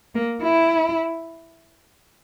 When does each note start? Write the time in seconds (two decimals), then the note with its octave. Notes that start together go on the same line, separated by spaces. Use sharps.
0.15 A#3
0.43 E4